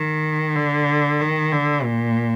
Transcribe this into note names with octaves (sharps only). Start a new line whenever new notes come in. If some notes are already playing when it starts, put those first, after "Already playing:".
Already playing: D#3
D3
D#3
D3
A#2